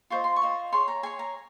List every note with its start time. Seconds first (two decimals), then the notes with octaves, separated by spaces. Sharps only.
0.10 F4 C5 D#5 C#6
0.24 C6
0.36 C#6
0.42 F4 C5 D#5
0.72 G#4 C#5 C6
0.88 A#5
1.03 G#4 C#5 G#5
1.19 A#5